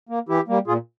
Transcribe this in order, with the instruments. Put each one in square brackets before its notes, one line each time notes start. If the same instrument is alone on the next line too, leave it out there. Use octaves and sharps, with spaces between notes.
[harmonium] A#3
E3 E4 G4
G3 A#3
A#2 F4 G#4